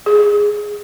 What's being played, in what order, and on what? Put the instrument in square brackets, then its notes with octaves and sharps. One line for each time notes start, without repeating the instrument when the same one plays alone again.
[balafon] G#4